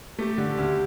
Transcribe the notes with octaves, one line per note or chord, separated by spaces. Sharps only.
A3 G4
D3
D2